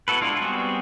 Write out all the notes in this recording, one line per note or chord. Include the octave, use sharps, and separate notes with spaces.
B3 E4 F#4 A4 B4
G#3 D4 E4 F4
G3 B3 C4 F#4 G#4